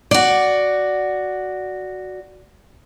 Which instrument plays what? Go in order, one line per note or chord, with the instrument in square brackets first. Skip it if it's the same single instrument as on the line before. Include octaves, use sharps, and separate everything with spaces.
[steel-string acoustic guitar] F#4 D5